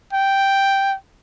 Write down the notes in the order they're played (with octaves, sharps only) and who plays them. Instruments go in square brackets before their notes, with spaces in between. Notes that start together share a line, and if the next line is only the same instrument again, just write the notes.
[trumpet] G5